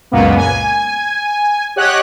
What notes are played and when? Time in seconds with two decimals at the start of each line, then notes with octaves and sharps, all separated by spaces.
0.11 C#2 F#2 A#2 A#3 B3
0.36 G#5
1.76 G4 C#5 D#5 F#5 F#6